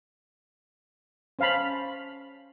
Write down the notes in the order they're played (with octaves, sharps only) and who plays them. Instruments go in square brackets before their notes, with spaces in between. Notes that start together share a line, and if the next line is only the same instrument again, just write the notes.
[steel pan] C#4 C5 F5 A5 B5